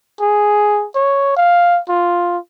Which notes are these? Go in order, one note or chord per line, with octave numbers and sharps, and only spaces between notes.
G#4
C#5
F5
F4